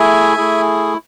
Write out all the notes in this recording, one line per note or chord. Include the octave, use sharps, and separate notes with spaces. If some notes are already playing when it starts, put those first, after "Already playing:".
Already playing: A3 E4 G#4 E5 G#5
A3 E4 G#4